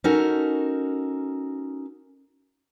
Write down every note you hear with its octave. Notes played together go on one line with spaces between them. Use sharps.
C#4 D#4 F#4 A4 A#4